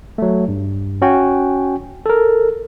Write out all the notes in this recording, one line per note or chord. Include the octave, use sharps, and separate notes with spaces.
F#3 A3
G2
C#4 F#4 G5 G#5
A4 A#4